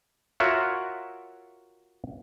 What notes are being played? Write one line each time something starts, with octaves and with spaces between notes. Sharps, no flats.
F4 F#4 A#4 C#5 E5 F#5